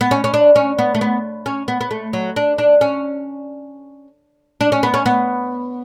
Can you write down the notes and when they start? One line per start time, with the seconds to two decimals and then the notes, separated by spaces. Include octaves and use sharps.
0.01 B3
0.11 C#4
0.24 C#4
0.34 D4
0.56 C#4
0.79 B3
0.95 A3
1.01 B3
1.46 C#4
1.68 B3
1.81 B3
1.91 A3
2.13 F#3
2.36 D4
2.58 D4
2.81 C#4
4.61 D4
4.72 C#4
4.83 B3
4.94 C#4
5.06 B3